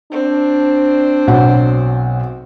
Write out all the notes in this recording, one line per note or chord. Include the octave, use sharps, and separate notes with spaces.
C4 D4
B1 F#3 F#5